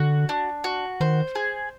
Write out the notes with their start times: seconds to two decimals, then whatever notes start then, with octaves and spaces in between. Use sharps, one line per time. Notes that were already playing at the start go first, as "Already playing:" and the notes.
Already playing: D3 F#4
0.29 D4
0.64 F#4
1.00 D#3 C5
1.35 G#4